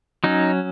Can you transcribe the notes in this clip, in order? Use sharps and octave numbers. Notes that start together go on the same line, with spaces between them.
F#3 C#4 D#4